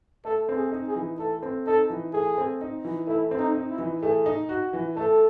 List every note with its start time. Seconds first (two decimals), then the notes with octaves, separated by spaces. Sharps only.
0.25 A3 A4
0.49 C4
0.56 G#4
0.72 D#4
0.88 G#4
0.96 E3
1.19 A3 A4
1.43 C4
1.67 D#4 A4
1.90 E3
2.13 A3 G#4
2.38 C4
2.61 D#4
2.84 E3
3.07 A3 E4
3.31 C4
3.39 D#4
3.55 D#4
3.70 E4
3.78 E3
4.02 A3 G#4
4.26 D#4
4.49 F#4
4.73 E3
4.96 A3 A4